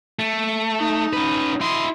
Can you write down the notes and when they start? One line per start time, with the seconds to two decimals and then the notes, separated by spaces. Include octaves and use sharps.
0.19 A3
0.79 D#4
1.13 C#4 B4
1.61 E4 D#5 C6